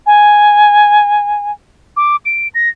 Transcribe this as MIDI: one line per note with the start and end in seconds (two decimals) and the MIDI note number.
0.06 1.52 80
1.97 2.16 86
2.25 2.48 98
2.55 2.69 94